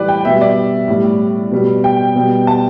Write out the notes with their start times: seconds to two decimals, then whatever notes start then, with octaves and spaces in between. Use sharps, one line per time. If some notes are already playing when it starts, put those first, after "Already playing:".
Already playing: A2 E3 G3 G4 B4 D5
0.08 G5
0.25 B2 G3 E5
0.41 D5
0.88 A2 G3
1.51 B2 G3
1.84 G5
2.15 B2 G3
2.47 A5